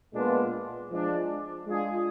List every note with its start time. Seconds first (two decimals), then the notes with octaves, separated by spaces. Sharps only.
0.14 A#2 G#3 B3 D4 F4
0.91 F3 G#3 D4
1.67 G#3 D4 F4 G#4